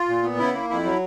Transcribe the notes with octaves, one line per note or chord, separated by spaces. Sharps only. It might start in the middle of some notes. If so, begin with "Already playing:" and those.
Already playing: F4
A#2
B3
C#3 E4
A#3
F2 E4
F#3